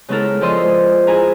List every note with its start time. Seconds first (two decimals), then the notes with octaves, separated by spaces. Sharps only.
0.09 C#3 G#3 B3 E4 A4 A#4
0.41 F3 G#3 D5 D#5 C6 E6
1.07 E4 G#4 G#5 A#5